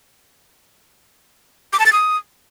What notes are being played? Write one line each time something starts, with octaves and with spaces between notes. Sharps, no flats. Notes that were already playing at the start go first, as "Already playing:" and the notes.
D6
A5
A6
D#6